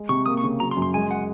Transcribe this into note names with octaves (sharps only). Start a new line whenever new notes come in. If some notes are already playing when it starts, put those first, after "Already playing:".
Already playing: G#3
C3 C#6
A#3 D#6
C#6
C#3
F#3 A#5
C6
F#2
C6
G#3 G#5
F#5